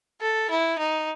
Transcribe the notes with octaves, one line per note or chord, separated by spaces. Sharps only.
A4
E4
D#4